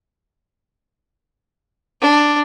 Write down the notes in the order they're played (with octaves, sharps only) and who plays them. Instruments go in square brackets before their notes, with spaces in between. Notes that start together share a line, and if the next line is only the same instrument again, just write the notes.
[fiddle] D4